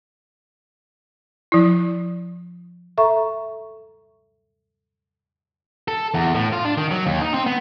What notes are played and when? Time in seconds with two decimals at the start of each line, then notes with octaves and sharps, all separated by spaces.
1.52 F3 E4
2.98 A4 E5 A#5 C#6
5.88 A4
6.14 E2
6.35 A2
6.53 F4
6.65 D4
6.78 D#3
6.91 F#3
7.06 D#2
7.21 D#4
7.34 C4
7.46 B3